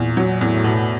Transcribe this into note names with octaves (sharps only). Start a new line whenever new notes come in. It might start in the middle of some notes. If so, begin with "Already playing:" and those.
Already playing: E2 A#2
F#3
E2 A2
B2